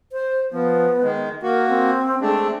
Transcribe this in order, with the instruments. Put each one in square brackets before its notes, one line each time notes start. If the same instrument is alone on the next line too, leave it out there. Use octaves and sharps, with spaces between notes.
[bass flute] C5
[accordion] F3 [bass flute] B3
[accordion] D#3 G#3
[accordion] A#3 F#4 [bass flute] A#4
[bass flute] C4
[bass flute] G#3 [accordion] A3 C4 D4